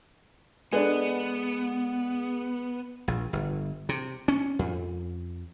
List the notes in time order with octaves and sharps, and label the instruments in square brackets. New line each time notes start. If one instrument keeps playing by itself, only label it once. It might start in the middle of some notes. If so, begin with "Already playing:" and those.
[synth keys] G#3 [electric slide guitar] B3 [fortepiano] D4 A4 B4
[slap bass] A#1
G1
C3
C#4
F2